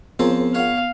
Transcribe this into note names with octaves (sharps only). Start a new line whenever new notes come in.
F3 B3 C4 F4 G#4 A#4 C#5
C#5 F5 F#5